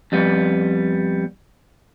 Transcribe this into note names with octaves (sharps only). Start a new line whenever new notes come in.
F2 G3 B3